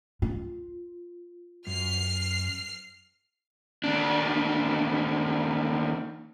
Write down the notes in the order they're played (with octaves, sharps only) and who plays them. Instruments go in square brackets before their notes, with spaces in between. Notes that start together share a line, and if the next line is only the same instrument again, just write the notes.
[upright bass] F4
[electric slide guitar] F#2 [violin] F6 C7
[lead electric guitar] D#2 D4